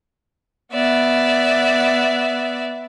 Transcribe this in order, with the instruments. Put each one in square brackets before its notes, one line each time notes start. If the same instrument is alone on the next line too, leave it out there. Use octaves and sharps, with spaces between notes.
[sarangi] B3 [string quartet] D5 E5